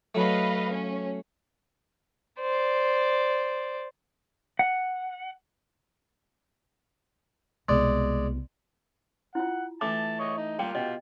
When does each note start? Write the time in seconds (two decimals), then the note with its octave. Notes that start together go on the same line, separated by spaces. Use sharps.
0.15 F#3 A3 B4 D#5 F5
0.71 C#4
2.41 C5 D5
4.59 F#5
7.69 C2 B2 G#3 D5
9.35 E4 F4 F#5
9.81 E3 A3 A5 D6
10.20 C#5 D#5
10.38 D#4
10.59 G3 A#3 F4 G4 G5
10.75 B2 D#5